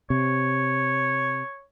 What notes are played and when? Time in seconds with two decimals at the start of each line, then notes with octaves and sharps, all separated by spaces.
0.10 C3 C#5